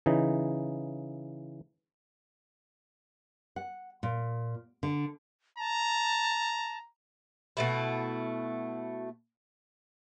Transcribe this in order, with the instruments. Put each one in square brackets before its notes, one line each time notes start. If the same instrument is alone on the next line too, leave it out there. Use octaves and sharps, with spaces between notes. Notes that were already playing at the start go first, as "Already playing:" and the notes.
[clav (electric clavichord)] C#3 E3 D#4
[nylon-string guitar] F#5
A#2
D3
[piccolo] A5 [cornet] A#5
[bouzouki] B2 A3 E4